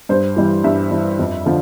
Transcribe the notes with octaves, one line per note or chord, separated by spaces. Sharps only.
G2 C5
E3 G3
G2 E5
E3 G3
F2
D3 F3